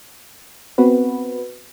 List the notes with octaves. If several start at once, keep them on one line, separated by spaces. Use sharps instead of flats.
B3 C4 F#4 B4